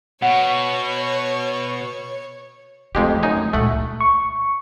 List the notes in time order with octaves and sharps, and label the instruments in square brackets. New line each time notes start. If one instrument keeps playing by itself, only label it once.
[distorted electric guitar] B2 [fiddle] C#5 [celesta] F#5
[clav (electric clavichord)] F2 G#3 G4 [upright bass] A3
[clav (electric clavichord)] F#2 D#4 G#5
[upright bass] C#2 A#2 [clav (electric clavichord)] A3 F#5
[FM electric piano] C#6